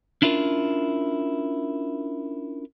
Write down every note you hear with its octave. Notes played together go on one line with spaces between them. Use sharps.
C#4 D4 E4 F4 A#4